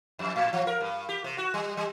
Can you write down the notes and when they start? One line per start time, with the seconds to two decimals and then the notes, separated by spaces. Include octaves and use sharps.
0.19 F2
0.36 A2
0.53 F3
0.67 A#4
0.81 G2
1.09 G4
1.24 C3
1.38 F#4
1.54 G3
1.77 G3